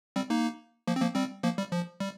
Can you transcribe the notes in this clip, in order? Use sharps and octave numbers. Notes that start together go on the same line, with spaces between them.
G3 C4
A#3 D#4
F3 A#3
C4
F3 A#3
G3 C4
F3 A#3
G3
F3
G3